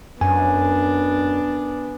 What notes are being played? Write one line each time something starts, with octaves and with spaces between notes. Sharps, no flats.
F#2 B3 D4 G#5